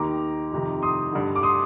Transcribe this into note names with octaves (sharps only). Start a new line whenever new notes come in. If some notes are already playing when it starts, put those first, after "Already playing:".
Already playing: D#2 D#3 A#5 D6
F2 C3 D#3
C6 D#6
G2 D3
D6
C6 D#6